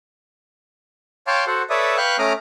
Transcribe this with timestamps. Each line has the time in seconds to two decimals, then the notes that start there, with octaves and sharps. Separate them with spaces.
1.27 C#5 F5 G5 A5 C6 D6
1.47 F#4 A4 C5 F#5
1.70 A4 B4 C#5 D5 E5 D#6
1.97 B4 F5 G5 C#6 F#6
2.19 A3 C#4 A#5 D6 D#6 F6